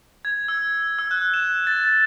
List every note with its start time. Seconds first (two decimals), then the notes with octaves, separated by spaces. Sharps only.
0.25 G#6
0.48 E6
0.99 E6
1.11 F#6
1.34 E7
1.67 A6
1.84 A6